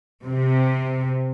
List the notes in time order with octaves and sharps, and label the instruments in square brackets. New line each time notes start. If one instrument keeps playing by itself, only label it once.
[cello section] C3